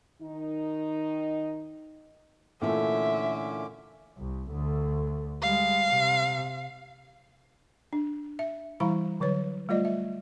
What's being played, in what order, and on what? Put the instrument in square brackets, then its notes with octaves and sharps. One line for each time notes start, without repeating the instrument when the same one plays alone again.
[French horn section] D#3 D#4
[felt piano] A#2 E3 A3 [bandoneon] D3 C#4 D6 [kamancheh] E5
[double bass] C2
D2 D3
[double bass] G3 G#3 [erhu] F5
[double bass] C3
[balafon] D4
E5
E3 G3 E4 F5 A#5 B5
D3 F#3 B4 C#5
G3 A3 F4 D5 D#5
E5